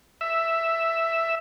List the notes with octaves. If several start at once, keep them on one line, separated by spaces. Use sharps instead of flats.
E5